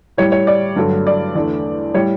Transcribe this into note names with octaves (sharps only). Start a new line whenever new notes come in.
A2 G3 C#5
C#5
D5
G2 D3 F#3 A3
D5
E2 D3 A3 D5
A2 G3 C#5